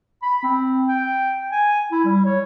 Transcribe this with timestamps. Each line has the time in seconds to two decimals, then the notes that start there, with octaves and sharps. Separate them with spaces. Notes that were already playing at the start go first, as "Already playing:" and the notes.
0.22 B5
0.43 C4
0.88 G5
1.51 G#5
1.92 E4
2.05 G3
2.26 C#5